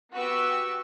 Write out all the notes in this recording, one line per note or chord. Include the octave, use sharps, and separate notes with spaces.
B3 F#4 G4 B4 C#6 E6